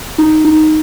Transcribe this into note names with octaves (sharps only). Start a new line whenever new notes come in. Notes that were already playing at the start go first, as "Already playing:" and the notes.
D#4
D#4